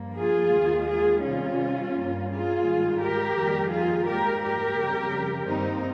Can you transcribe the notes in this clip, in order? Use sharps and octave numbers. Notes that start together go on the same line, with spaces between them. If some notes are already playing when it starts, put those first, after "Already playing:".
Already playing: G2 F3 A#3
F4 G#4
D#2 D#3 G#3
F4 G#4
C3 D#3 G3 C#4 F4
G2 G3 A#3
F4 G#4
G#2 D#3 G3
G4 A#4
F2 D#3 G3 A#3
F4 G#4
G#2 G3 A#3 G4 A#4
G4 A#4
F2 C#3 G3
G2 D#3 G3 A#3 C4 D#4